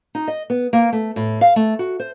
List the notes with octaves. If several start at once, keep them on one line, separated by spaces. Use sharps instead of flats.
D#4
D#5
B3
A#3
A3
A2
F5
A3
F#4
C5